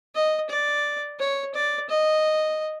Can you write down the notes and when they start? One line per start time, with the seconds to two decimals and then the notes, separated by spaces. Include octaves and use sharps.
0.15 D#5
0.50 D5
1.20 C#5
1.54 D5
1.90 D#5